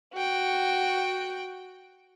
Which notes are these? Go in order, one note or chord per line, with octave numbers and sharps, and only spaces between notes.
F#4 G5